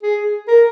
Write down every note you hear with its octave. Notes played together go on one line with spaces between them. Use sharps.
G#4
A#4